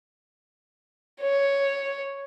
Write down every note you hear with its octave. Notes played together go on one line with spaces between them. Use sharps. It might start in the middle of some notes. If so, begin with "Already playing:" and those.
C#5